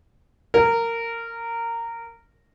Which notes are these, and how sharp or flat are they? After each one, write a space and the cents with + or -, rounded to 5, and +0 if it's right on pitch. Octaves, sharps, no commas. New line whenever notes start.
A#4 -15